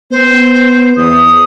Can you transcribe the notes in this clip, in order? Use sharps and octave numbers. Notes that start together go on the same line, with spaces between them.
B3 C5
E2 D#6